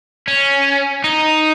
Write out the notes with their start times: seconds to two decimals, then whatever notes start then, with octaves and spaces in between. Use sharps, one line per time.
0.28 C#4
1.04 D#4